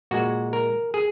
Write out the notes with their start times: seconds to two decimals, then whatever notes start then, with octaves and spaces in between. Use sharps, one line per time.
0.11 A#2 G#3 F#4
0.53 A#4
0.94 G#4